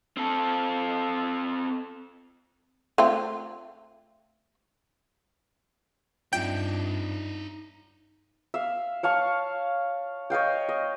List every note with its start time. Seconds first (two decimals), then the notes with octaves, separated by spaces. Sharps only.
0.17 C4 A4
2.98 A3 C4 F4
6.33 G2 C4 D#4 F4 D5 E5 G5
8.54 E5 F5
9.03 C#5 F5 A5 C#6
10.30 C#5 D#5 F5 G5
10.69 D#5